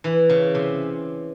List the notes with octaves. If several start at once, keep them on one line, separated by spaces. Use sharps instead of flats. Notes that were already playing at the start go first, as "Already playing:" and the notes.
E3
C#3
C3